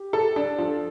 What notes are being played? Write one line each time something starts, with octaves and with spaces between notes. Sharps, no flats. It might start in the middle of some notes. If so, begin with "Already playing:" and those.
Already playing: G4
A4
D4
F3 A4